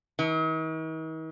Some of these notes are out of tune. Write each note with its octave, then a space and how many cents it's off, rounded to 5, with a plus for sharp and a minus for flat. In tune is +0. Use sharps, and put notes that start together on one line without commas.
D#3 +45